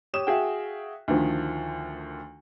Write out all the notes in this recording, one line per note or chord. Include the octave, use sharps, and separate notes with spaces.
G4 C#5 D#6 E7
F#4 G#4 E5 F5 G5
D2 D3 D#3 F3